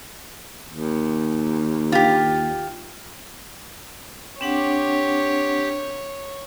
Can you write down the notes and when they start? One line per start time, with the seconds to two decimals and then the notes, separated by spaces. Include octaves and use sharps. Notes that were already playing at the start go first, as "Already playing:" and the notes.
0.71 D#2
1.92 F4 G4
4.41 C4 D4 G4 C#5 F#5